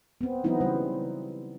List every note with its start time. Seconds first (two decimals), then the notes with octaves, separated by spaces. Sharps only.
0.21 B3 C4
0.44 E3 F#3 B3 C4 D#4 E4
0.60 C#3 G3 C5